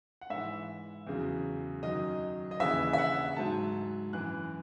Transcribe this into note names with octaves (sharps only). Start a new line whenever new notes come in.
F#5
G#2 E3 E5
E2 C#3 F#3
F#2 D#3 F#3 D#5
D#5
D#2 C#3 E3 E5
E5
F#5
G#2 F#3 A5
F#2 E3 F#6